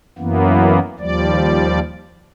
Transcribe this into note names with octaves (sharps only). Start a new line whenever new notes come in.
F#2 E3 A#3 B3
D#2 F3 G3 D5